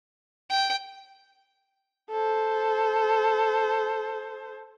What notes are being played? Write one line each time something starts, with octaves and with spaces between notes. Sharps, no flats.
G5
A4 C5